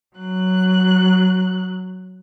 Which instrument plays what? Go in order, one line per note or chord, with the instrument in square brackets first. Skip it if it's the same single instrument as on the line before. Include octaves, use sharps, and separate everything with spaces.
[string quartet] F#3 F#6